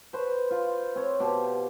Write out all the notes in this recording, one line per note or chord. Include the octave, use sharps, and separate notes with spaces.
B4 C5 C#6
F4
C4 C#5
B2 G4 A5 C6